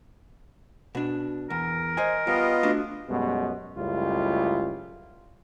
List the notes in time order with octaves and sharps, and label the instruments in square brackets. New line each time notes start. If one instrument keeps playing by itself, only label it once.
[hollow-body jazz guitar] B2 D4
[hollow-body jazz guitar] E2 [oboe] A#4
[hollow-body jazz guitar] C5 D#5 G#5
[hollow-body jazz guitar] G3 [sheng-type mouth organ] B3 F4 D#5
[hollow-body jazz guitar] A3 D4 F#4
[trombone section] F#2 B2 G3 G#3 B3
C#2 F#2 G3 A3 E4 F4